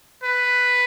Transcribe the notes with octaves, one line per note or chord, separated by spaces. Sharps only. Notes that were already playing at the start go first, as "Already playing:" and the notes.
B4